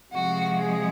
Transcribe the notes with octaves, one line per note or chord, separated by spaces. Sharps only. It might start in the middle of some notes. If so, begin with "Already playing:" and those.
C3 F3 G#3 F#4
G#4